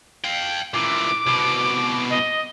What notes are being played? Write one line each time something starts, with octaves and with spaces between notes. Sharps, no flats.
F5 G5
A#2 E3 D6
C2 B2
D#5